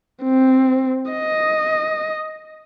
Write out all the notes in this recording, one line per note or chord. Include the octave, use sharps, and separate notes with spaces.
C4
D#5